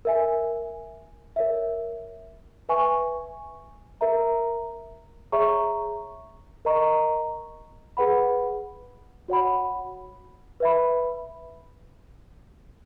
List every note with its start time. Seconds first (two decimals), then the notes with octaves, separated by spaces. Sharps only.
0.05 A#4 E5 G#5
1.36 A#4 C#5 E5
2.69 B4 E5 G#5 C#6
4.01 A#4 E5 A#5
5.32 G#4 C#5 E5 A#5 C#6
6.65 A#4 D#5 A#5 C#6
7.97 G#4 B4 F#5 B5
9.28 F#4 C#5 F#5 B5
10.60 B4 E5 B5